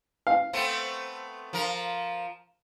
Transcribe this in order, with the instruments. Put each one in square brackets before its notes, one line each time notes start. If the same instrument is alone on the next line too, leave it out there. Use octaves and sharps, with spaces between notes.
[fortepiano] F5
[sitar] A3 B3 C4
F3 A#4